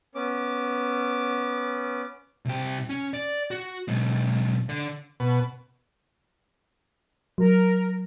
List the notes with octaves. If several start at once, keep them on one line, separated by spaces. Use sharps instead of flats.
B3 C#4 D6
C2 G4
C#4
D5
F#4
B1 G#3
D3 D4
B2
F#3 A#4